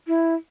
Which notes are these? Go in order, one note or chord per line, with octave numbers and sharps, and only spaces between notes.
E4